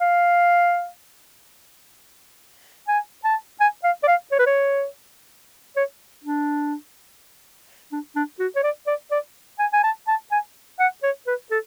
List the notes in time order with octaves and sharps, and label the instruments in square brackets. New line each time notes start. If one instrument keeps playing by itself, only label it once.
[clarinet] F5
G#5
A5
G#5
F5
D5
F5
C#5
B4
C#5
C#5
D4
D4
D4
F#4
C#5
D5
D5
D5
G#5
G#5
A5
A5
G#5
F#5
C#5
B4
A4